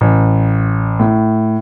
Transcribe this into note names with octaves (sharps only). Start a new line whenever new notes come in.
A1
A2